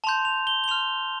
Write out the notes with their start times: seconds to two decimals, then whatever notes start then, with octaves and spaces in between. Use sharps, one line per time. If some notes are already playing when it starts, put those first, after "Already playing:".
0.04 A5 C6 G6 F7
0.25 F7
0.47 G7
0.64 G7
0.68 C6 F6 F7